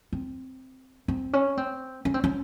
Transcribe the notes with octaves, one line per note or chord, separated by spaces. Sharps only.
C4
C4
C#4
C4
C#4
C4
C#4